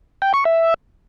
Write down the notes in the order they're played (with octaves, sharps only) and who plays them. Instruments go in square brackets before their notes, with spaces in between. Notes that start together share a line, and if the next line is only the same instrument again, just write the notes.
[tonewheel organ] G5
C#6
E5